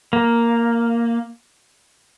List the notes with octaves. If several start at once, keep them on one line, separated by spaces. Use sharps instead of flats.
A#3